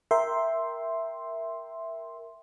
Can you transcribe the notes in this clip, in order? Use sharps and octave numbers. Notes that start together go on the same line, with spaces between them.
A#4 E5 G5 C6